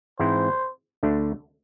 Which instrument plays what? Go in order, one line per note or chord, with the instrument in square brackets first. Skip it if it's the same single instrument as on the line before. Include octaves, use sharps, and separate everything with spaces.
[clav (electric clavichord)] G#2 E3 G#3 C4 E4 [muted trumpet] C5
[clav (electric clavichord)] D2 D3 A3 D4